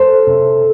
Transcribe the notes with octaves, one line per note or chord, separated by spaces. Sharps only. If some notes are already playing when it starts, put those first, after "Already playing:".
Already playing: A4 C5
C3